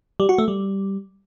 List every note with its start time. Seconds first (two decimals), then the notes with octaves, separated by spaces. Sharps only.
0.20 G3
0.29 F#4
0.38 A3
0.48 G3